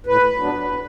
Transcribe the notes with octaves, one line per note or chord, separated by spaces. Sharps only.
A2 B4
F#3 B3 D4
A2